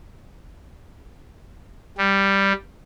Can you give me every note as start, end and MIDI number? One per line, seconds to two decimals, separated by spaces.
1.98 2.53 55